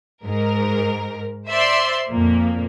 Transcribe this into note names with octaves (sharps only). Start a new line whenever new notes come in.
G#2 A#4
C5 D5 E5 C6
F2 A#2 A#3